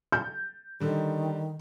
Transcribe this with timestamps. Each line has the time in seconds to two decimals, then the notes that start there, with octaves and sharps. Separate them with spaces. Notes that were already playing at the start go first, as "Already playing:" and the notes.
0.12 G6
0.80 D3 D#3 G3